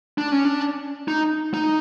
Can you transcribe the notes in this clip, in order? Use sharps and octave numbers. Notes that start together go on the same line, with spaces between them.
D4
C#4
D4
D#4
D#4